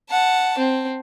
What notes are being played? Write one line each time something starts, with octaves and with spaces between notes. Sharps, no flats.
F#5 A5
C4